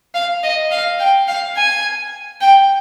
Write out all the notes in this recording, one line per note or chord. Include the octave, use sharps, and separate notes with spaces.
F5
D#5
F5
G5
F5
G#5
G5